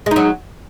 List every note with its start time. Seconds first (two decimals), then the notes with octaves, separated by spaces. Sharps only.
0.06 G#3
0.11 D#4
0.16 F#3